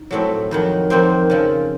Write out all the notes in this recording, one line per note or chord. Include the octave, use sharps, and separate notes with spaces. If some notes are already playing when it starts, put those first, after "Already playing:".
Already playing: D#4
A2 F#3 A3 C4
F2 D#3 F#3
F2 D#3 A#3 C4 C5
C#3 F3 C4